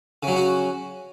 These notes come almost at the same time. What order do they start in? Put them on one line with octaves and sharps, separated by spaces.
C#3 F#3 C#4 F#4